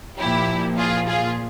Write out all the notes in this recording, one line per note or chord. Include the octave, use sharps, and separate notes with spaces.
A#2 F3 E4 G4
F4 G#4
F4 G#4